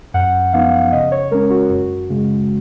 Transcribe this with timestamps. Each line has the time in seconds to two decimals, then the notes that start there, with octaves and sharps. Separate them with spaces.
0.14 F#2 F#5
0.53 F3 B3 D#4 F5
0.92 C#3 D#5
1.12 C#5
1.31 G#3 A#4
1.34 C#4
1.50 F#4
1.70 F#2 F#4
2.09 C#3 G#3